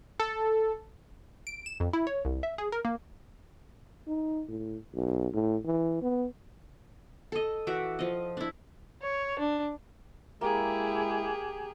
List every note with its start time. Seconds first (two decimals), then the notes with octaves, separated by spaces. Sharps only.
0.20 A4
1.47 D7
1.66 E7
1.80 F2
1.93 E4
2.07 C#5
2.25 C2
2.43 E5
2.58 G#4
2.72 A#4
2.85 A#3
4.07 D#4
4.48 A2
4.94 B1
5.33 A2
5.65 E3
6.02 B3
7.32 A4 D#5
7.67 E3 F#4 E5 D6
7.99 F3 D#5
8.37 D4 E4
9.02 C#5
9.39 D4
10.41 G#3 A#3 E4 G4 G#4